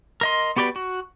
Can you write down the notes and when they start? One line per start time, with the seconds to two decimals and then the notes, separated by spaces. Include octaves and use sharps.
0.21 A#4 D#5 C6
0.56 B3 F#4 G4 B4 D5
0.76 F#4